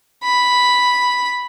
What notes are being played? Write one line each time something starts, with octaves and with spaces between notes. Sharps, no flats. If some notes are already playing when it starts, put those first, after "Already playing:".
B5